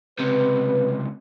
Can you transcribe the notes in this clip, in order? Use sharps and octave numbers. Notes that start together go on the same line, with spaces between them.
C#2 C3 B4